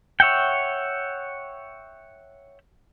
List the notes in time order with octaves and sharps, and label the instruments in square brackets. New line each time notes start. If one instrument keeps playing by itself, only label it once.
[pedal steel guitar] C#5 E5 F#5 G5